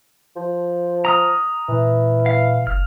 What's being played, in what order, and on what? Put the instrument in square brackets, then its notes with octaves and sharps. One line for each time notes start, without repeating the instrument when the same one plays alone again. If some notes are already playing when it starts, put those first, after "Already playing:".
[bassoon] F3
[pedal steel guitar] A#5 D#6 F6
[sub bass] A#2 [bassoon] E3
[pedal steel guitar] F5
[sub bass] F#1 [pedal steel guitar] F6